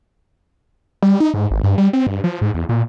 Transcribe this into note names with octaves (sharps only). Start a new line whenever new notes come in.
G3
D#4
G#2
G#1
G2
G3
C4
G2
F3
G#2
E2
A#2